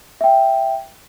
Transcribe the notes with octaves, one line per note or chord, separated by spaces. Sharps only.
E5 G5